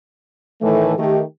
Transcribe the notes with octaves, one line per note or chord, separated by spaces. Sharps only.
A2 D#3 E3 A3
D#3 A3 G4